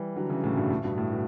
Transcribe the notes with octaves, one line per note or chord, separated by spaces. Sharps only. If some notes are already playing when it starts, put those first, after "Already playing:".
Already playing: E3 G3
D3 F#3
C#3 E3
A2 C#3
G2 B2
A2
G2 B2
A2
B2